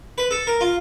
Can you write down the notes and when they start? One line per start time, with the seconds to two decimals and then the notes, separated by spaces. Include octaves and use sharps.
0.18 B4
0.31 A4
0.47 A#4
0.61 F4